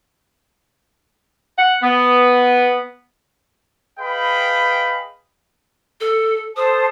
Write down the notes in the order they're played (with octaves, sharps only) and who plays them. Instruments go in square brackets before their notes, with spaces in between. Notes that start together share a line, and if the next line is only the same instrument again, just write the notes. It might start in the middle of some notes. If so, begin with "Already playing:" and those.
[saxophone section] F#5
B3
[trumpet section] G#4 B4 D#5 F5 G5 B5
[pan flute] A4
[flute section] A4 C5 A5 [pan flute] D#6